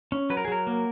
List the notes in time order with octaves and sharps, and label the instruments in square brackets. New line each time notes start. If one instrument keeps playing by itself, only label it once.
[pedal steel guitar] C#4
F#3 B4
A#4
G#4
F#3 A#4
A#3